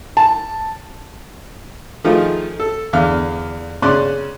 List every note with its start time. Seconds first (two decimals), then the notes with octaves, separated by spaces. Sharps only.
0.17 A5
2.04 D#3 F3 A3 F4 G#4
2.60 A4
2.93 E2 D3 F5 F6
3.82 C#3 C#4 D5 C6 F#6